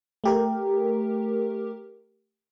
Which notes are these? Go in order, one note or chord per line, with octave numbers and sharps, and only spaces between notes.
A3 G4 A#4